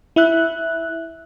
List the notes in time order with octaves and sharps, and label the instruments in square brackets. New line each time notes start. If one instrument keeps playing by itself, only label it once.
[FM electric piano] E4 E5 F#6